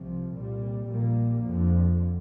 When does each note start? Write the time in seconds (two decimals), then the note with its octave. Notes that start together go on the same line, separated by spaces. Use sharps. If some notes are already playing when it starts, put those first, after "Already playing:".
Already playing: C2 C3 F3
0.32 C2 A#2 G3
0.87 A#1 A#2 G3 A#3
1.41 F2 D3 F3